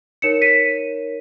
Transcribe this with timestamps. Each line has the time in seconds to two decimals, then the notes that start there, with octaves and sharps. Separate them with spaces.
0.22 D#4 A#4 C#5 C#7 E7
0.42 B6 D#7